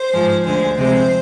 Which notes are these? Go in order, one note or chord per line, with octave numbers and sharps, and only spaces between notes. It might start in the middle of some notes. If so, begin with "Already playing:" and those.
Already playing: C5
G#2 F3 G#3
D2 D3 G#3 C5
C3 F3 G#3 C4 C5